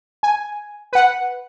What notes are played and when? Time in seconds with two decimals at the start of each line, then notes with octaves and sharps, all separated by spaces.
0.23 G#5
0.93 B4 F#5